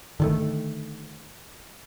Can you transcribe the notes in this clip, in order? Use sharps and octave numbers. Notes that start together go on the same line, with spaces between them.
D3 D#3 A3